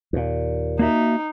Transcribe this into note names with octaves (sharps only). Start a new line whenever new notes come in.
D#2 A#2
A#3 D#4 F#4 E5